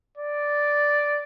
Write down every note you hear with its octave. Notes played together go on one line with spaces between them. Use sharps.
D5